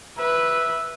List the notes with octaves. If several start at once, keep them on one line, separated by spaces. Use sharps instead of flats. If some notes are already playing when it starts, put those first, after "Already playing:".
B4 E5